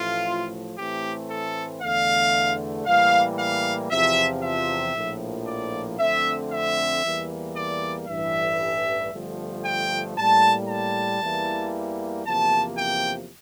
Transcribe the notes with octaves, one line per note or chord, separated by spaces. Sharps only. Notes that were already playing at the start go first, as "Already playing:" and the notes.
Already playing: A1 A2 F3 A3 F4
A2 E3 A3 C4 G4
A4
E2 D3 A3 F5
A2 E3 G3 A#3 F5
F5
E2 C3 F3 E5
E5
A#1 A2 F3 A#3
D5
F2 D3 A3 C4 E5
E5
E2 E3 G3 A#3
D5
A1 G2 E3 E5
G1 G2 F3 A3
G5
A2 G3 A#3 A5
A5
E2 E3 G3 A#3
E2 C3 F3 A#3 A5
G5